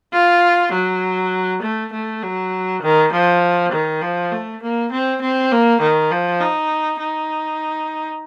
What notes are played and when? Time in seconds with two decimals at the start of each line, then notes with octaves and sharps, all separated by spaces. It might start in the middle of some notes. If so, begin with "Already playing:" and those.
0.13 F4
0.73 F#3
1.62 A3
1.93 A3
2.22 F#3
2.83 D#3
3.12 F3
3.72 D#3
4.02 F3
4.32 A3
4.62 A#3
4.92 C4
5.21 C4
5.51 A#3
5.81 D#3
6.11 F3
6.40 D#4
7.00 D#4